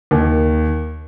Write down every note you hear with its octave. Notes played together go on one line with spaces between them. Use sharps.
D#2